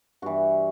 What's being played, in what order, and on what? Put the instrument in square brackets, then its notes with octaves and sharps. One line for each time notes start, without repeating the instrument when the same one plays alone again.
[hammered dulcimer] G2 E3 F#4